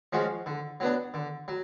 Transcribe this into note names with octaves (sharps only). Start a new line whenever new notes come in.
F3 G#3 C#4 F#4
D3
F#3 B3 D4
D3
F#3